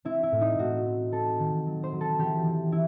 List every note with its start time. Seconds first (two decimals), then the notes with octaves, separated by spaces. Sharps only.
0.05 C4 E4
0.23 E4
0.32 A2
0.41 D#4
0.59 A2 F#4
0.86 C4
1.12 C4 A4
1.39 D#3
1.66 F#3
1.83 C5
1.92 F#3
2.01 A4
2.18 E3 G4
2.47 E3
2.72 E4